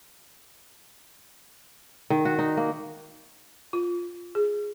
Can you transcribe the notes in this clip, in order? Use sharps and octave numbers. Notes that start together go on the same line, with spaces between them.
D#3
F#4
D#4
A#3
F4
G#4